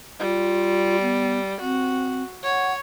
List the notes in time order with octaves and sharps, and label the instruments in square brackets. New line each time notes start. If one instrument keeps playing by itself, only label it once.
[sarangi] G3 [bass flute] F4
[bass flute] B3
[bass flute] C4 [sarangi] F#4
[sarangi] C#5 [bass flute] F#5